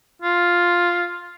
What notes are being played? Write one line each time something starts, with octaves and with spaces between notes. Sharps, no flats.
F4